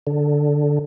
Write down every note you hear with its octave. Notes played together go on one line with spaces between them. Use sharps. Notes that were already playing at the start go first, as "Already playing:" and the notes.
D3